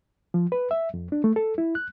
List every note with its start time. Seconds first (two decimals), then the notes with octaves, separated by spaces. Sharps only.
0.34 F3
0.52 B4
0.71 E5
0.94 F2
1.12 D4
1.24 A3
1.36 A4
1.58 E4
1.75 F#6